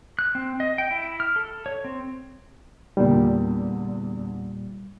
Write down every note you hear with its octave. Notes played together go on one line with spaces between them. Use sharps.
F#6
C4
D#5
G5
E4
F6
A4
C#5
C4
E2 A#2 D3 G3